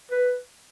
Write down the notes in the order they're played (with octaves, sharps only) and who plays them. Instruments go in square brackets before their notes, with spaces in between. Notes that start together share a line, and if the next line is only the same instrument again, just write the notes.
[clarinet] B4